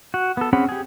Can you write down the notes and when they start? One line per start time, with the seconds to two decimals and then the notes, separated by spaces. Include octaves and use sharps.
0.14 F#4
0.37 B3 A4
0.53 C4 C#4 G#4 F#5 B5
0.69 G4 G#4